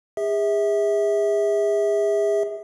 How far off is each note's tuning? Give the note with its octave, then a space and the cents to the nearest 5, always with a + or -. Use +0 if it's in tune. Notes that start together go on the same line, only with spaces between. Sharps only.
G#4 -35 E5 -25